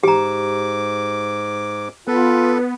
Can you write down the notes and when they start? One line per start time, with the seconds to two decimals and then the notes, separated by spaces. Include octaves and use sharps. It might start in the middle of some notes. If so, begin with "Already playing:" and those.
0.04 G#2 G4 A#5 D6
2.07 B3 F4 A4 B4